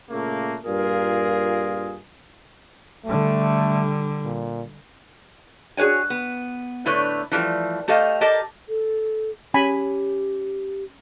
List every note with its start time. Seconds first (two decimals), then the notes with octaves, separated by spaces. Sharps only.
0.10 A#2 C#3 A3 A#3
0.64 G2 A#2 F4 G#4 A#4
3.05 D3 G3 A3
4.25 A#2
5.77 F#4 G#4 B4 C#5 G#5
6.10 B3
6.86 A2 D3 A3 B4 C#5
7.32 E3 F3 G3 A3
7.88 A3 G4 A4 D#5 F5
8.21 G4 A4 A#4 D#5 A5
8.69 A4
9.54 C#4 G4 G#5 B5